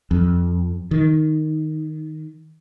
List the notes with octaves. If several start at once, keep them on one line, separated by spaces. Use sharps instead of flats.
F2
D#3